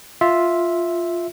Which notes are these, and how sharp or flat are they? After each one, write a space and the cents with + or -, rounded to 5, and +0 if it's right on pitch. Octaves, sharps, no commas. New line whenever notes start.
F4 +0 E5 +0